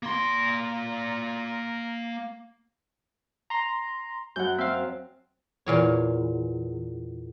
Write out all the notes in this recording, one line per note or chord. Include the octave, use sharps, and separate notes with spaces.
A#3 C6
A#5 C6
F#2 F#5 G6
C4 E5 F5
E2 A#2 C#5